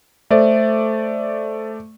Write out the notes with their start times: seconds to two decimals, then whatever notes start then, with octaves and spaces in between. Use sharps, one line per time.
0.31 A3 A4 C5 D5 E5